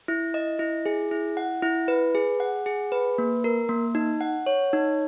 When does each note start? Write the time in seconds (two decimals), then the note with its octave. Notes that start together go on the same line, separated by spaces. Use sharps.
0.08 E4
0.34 D#5
0.59 E4
0.86 G#4
1.11 E4
1.37 F#5
1.63 E4
1.88 B4
2.15 G#4
2.40 F#5
2.66 G#4
2.92 B4
3.18 A#3
3.44 A#4
3.69 A#3
3.95 D#4
4.21 F#5
4.46 C#5
4.73 D#4